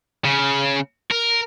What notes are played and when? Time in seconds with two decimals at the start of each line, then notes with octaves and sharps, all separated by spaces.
0.25 C#3
1.11 A#4